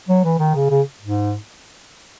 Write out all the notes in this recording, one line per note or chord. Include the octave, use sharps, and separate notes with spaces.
F#3
E3
D#3
C#3
C#3
G#2